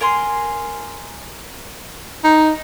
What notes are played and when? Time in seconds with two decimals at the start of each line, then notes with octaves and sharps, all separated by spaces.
0.01 A#4 G#5 C6
2.24 D#4